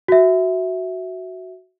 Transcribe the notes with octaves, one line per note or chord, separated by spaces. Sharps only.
F#4 E5